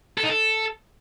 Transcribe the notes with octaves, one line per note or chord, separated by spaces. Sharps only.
A4
D#4
A4